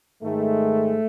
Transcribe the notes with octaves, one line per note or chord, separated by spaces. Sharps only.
G#2 D#3 G#3 A3